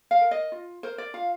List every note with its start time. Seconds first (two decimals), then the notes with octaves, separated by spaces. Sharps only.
0.11 F5
0.21 A#4
0.31 D#5
0.52 F4
0.83 A#4 C5
0.98 D5
1.14 F4 F5